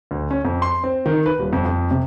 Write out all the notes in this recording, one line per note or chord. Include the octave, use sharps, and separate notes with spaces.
D2
C#4
F2
C6
C4
D#3
B4
D#1
F2
F2
C3